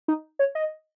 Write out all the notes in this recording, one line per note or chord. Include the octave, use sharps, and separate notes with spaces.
D#4
C#5
D#5